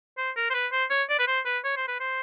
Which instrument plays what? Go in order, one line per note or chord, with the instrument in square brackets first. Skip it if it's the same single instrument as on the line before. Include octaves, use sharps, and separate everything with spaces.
[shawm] C5
A#4
C5
B4
C5
C#5
D5
B4
C5
B4
C#5
C5
B4
C5